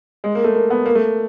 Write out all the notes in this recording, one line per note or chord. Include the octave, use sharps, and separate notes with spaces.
G#3
A#3
A3
A#3
B3
A#3
A3